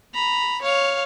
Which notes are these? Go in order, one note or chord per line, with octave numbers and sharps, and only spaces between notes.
A#5 B5
C#5 F5